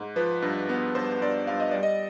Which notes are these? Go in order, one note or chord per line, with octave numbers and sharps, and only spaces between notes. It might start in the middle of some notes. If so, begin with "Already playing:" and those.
Already playing: G#2
F3 B4
G2
B3
G2 C5
G2 D5
G2 F5
D#5
G3 D5
D#5